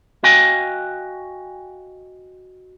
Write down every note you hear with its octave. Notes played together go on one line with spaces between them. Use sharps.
F#4 D#5 F5 G5 G#5